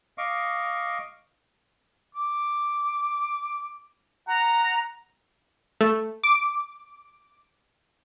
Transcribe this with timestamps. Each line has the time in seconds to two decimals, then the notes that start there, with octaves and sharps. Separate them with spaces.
0.18 D#5 F5 C#6 D6
2.15 D6
4.28 F#5 A#5
5.81 A3
6.23 D6